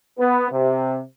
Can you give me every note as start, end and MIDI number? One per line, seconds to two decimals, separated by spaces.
0.18 0.47 59
0.51 1.00 48